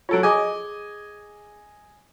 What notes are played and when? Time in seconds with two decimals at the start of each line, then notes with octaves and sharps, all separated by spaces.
0.09 F#3 F4 A4 C#5 D7
0.23 G#4 D#5 G#5 D6